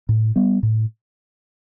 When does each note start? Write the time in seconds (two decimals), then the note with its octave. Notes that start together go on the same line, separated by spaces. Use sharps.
0.09 A2
0.36 G3 B3
0.63 A2